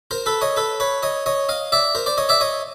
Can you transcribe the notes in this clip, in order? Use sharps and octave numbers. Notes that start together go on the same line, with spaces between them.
A#4 C5
A4 B4
C#5 D#5
A4 B4
B4 C#5
C#5 D#5
C#5 D#5
D#5 F5
D5 E5
A#4 C5
C5 D5
C#5 D#5
D5 E5
C#5 D#5